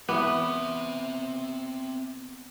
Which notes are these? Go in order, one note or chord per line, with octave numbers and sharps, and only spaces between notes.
E2 B3 C4 E5 D6